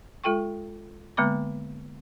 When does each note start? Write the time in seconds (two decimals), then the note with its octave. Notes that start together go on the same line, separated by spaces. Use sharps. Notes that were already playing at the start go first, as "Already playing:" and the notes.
0.24 G#3 F4 A4 G5 C#6
1.17 D3 G#3 A#3 B3 B5 D6